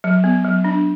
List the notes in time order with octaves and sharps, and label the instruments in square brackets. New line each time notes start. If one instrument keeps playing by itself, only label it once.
[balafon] F#3
B3
F#3
D4